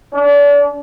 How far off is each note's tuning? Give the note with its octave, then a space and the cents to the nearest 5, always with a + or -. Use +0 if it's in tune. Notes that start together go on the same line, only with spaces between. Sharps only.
D4 -35